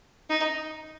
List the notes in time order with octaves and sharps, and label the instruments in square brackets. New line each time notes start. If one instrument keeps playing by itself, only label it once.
[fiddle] D#4